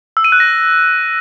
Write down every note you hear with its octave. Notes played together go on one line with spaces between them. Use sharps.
E6
D#7
F#6
A#6